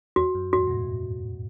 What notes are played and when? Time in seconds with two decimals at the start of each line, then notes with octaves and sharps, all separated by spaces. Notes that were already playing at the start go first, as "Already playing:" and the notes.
0.16 E2 F#4
0.35 F#2
0.53 E2 G#2 F#4
0.67 B2
0.71 A2